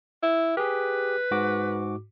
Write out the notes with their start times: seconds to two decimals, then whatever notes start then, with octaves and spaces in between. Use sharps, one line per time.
0.23 E4
0.57 G4 G#4 B4
1.31 G#2 F#4 D6